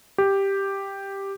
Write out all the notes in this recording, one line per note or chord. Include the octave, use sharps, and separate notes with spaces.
G4